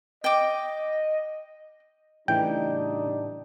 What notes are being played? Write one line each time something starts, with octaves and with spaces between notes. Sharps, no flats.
D#5 G5 D6
A2 C#3 E3 G3 D4 D#4 G5